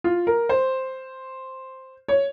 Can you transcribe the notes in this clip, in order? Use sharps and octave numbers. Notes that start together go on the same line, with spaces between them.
F4
A#4
C5
C#5